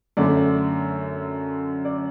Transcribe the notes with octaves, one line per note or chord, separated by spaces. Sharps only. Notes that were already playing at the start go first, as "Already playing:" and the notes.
F#2 D3 A3 D5
D5